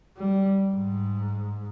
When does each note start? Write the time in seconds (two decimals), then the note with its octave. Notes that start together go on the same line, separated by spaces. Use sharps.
0.17 G3
0.75 G#2